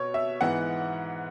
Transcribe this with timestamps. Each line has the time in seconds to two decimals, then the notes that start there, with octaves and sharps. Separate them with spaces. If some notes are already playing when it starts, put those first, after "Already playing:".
Already playing: B2 B3 C#5
0.14 E5
0.41 G#2 E3 B3 F#5